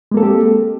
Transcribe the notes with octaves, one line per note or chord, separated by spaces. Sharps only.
G#3 A#3 C4 G4 A4